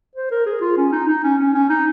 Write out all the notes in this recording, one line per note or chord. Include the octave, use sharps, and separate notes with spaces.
C5
A#4
G#4
F4
C#4
D#4
D#4
C#4
C#4
C#4
D#4